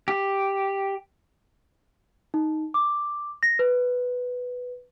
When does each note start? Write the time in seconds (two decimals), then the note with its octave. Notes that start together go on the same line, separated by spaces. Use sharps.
0.08 G4
2.34 D#4
2.74 D6
3.43 A#6
3.59 B4